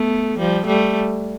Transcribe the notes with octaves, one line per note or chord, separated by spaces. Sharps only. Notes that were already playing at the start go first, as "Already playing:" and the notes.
Already playing: A3 B3
F3 G3
G3 A3